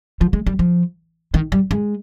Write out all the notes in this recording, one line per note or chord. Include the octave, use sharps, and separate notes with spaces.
F3
G#3
G3
F3
D#3
G3
G#3